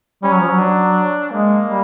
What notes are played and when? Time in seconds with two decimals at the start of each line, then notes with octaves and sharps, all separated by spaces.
0.23 G3 C#4
0.32 F#3
0.41 F3
0.50 F#3
0.59 D4
1.31 G#3 A#3
1.68 G3